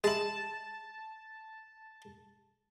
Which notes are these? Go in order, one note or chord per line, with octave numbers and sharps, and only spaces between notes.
G#3 E4 A5